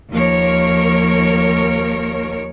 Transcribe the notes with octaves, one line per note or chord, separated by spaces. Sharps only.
D#2 F3 A#3 A#4 C#5